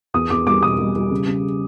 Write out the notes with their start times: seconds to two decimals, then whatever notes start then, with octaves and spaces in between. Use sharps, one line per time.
0.14 E2 D#6
0.30 E2 D6
0.47 G3 D6
0.62 B2 D#6
0.78 G3
0.96 G3
1.11 C#3
1.28 C#3